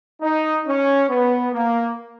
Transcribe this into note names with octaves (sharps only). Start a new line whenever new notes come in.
D#4
C#4
B3
A#3